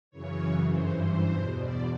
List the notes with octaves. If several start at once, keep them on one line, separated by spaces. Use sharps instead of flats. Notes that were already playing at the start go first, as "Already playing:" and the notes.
F#2 C#3 E3 C#5
G2 E3 C5
C5
E2 B2
D5